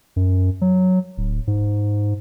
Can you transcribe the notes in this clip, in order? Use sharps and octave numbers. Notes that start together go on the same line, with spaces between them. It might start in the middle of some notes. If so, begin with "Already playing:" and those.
F#2
F#3
D1
G#2